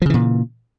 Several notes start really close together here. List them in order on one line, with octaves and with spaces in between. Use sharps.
F3 C#3 E3 A#2